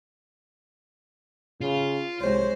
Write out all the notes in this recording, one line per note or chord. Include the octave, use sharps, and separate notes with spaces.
C#3 F4
C2 G#3 C5 C#5